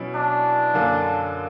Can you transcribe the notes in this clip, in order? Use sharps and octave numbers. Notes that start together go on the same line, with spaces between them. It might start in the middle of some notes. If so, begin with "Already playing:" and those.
Already playing: B2 F#3 C#4 E4
D4
F#2 D3 A#3